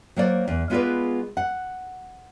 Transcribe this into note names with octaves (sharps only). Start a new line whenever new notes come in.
F#3 A#3 C5 D5
E2
G#3 B3 F4 G#4 B4 D5
F#5